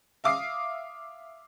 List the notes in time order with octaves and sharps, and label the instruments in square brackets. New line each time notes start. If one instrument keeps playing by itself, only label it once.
[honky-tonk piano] E5 F5 D6 D#6 C7